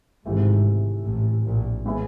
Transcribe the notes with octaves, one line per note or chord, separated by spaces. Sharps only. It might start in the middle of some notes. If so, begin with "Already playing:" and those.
G#1 G#2 C3 E3 A3
A1 A2
A#1 A#2
A2 E3 G#3 B3 E4